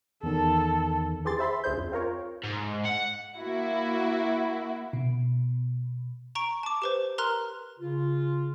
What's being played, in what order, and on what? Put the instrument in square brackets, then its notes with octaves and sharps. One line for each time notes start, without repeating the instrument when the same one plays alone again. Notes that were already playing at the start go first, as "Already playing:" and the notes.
[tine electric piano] E2 D#3 [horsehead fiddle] A4
[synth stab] E3 G4 G#4 C6 A6
C5 E5 B5 C6
D2 G#4 C5 G6
F2
C4 F4 A#4 C#5
[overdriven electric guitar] G#2
F#5
[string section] A#3 E4 F#4
[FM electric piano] B2
[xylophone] A#5 C#6 D7
A5 D6
G4 B4 C5
A#4 A#5 C6 F6 F#6
[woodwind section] C#3 F4